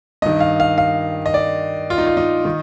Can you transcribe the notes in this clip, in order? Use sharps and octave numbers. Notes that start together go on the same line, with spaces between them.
G2 D#3 D#5
F5
F5
F5
D#5
D5
F4
D#4
F4
D#4
D#3